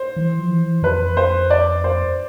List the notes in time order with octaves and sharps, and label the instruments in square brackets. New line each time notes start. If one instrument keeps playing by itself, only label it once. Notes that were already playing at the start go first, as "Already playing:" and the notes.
Already playing: [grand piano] C5
[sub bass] E3
F3
E3
[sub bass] F2 [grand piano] B4
[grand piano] C5
D5
C5